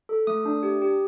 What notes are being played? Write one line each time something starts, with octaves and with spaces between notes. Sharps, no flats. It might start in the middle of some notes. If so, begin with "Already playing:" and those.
A4
A3 D#6
D4
G4
G4